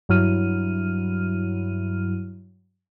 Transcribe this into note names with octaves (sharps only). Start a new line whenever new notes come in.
G2 F#3 E4 F6 D#7